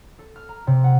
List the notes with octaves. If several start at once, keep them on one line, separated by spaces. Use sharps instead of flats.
A4
F6
A#5
C3
F#5